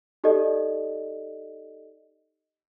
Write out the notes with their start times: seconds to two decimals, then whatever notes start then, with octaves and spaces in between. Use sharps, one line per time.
0.24 D#4 G4 A4 D5 D#5